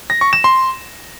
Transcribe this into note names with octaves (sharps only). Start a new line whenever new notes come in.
A#6
C#6
E7
C6